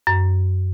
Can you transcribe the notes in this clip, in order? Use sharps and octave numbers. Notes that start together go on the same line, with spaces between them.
F#2